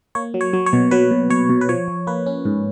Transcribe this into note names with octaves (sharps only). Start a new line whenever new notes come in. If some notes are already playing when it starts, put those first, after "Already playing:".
A#3 C#5
F#3
C#5
F#3
C#5
B2
F#3 B4
B2
B2 C#5
B2
B4
F3 C#5
F3
A#3 B4
C#4
G#2